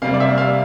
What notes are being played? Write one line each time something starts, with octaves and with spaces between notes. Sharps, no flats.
C3 G3 A#3 F5
D5
E5
F5